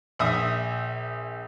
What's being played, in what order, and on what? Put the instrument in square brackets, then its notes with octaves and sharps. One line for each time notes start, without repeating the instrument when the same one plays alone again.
[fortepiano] A#1 E5 D#6